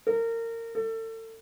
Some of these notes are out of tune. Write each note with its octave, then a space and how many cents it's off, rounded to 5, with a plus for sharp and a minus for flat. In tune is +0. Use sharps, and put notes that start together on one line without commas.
A#4 -25
A4 +35